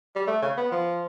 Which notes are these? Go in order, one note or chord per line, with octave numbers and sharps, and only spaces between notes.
G3
A3
C#3
B3
F3